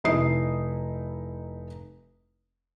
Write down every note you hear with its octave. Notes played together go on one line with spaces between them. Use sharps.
F1 D#4 E4 D#6 C7